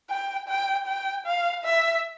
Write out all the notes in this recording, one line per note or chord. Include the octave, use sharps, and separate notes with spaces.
G5
G5
G5
F5
E5